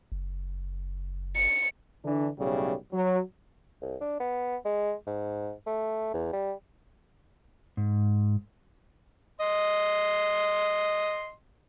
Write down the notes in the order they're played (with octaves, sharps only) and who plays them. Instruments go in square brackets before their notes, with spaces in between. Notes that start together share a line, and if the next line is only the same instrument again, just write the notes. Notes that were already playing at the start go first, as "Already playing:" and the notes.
[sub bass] F#1
[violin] C#7
[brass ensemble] D3 E3 D4
B1 A2 C#3 G3
F#3
[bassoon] C2
D4
B3
G#3
G#2
A3
E2
G3
[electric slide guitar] G#2
[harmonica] D#5 C6